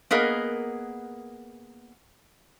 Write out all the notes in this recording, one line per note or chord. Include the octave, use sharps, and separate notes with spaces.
A#3 B3 G#4 A#4 D#5